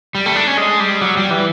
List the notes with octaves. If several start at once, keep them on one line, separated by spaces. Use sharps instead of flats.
G3
A3
D4
C#4
G#3
G3
F#3
G3
E3